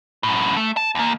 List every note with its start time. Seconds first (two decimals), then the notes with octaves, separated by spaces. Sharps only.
0.23 F#2 A2
0.56 A3
0.77 A5
0.95 D#2 A#3